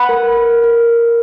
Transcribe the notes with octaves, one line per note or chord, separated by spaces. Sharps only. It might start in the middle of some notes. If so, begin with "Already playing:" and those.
Already playing: B4 F#5 B5
A#4
A#4
A#4